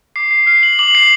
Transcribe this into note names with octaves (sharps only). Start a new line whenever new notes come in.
D6 C7
C7
F6 C7
F#7
D6 F#7
C7